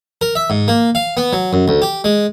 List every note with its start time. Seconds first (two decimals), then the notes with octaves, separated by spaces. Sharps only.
0.21 A#4
0.35 E5
0.50 G#2
0.68 A#3
0.95 F5
1.17 B3
1.33 F#3
1.53 F#2
1.68 D2
1.82 G4
2.04 G#3